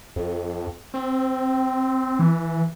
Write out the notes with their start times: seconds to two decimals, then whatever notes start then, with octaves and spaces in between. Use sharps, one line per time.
0.16 F2
0.94 C4
2.19 E3